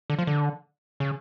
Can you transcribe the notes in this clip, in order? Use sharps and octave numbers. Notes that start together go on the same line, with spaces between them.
D3
F3
D3
C#3